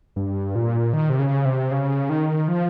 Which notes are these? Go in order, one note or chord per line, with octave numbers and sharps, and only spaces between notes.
G2
A#2
D#3
C3
C#3
C3
C#3
D#3
F3